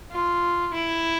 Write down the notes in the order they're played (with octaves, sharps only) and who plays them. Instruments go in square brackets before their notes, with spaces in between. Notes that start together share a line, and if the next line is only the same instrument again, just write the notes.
[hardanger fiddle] F4
E4